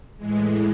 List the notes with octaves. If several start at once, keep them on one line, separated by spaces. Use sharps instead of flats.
A2 E3 G#3